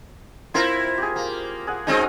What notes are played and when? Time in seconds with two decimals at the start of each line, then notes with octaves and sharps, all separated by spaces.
0.54 C4 E4 F4 A#4
0.98 G4 G#4
1.16 A#3
1.67 G#4 F#5
1.87 F#3 G#3 C4 C#4 D#4 G#4